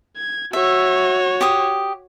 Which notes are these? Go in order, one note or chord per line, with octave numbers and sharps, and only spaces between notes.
G#6
F#4 C#5 E5
G4 C#6 D#6